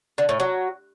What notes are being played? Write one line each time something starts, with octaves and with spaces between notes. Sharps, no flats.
D3
A2
F#3